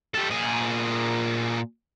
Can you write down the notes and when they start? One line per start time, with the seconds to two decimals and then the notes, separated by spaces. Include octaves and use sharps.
0.14 G3 A4
0.30 A#2 G#4